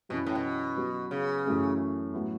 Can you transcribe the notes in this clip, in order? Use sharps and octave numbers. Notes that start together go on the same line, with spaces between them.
F#2 B2 E3 C#4 E4
A2
B2
F#3 B3 F#4
C#3
F#2 E3 A3 C#4
A2 F#3 B3 E4